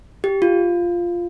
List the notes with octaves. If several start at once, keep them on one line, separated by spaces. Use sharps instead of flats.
G4
F4